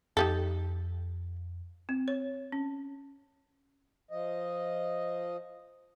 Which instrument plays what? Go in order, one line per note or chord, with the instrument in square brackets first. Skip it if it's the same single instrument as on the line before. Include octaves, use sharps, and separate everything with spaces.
[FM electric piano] F2 [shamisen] D#4 G4 A4
[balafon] C4
C#5
C#4
[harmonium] F3 D#5